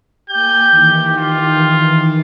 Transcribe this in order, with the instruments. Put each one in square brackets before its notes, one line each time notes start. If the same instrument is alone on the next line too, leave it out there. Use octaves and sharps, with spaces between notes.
[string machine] A#3 G#5 G#6 [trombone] G4 [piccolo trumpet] G6
[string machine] D#3 E3
[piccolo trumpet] F4